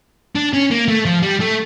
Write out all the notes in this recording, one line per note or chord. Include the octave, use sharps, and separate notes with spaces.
D4
C#4
A#3
A3
F3
G3
A3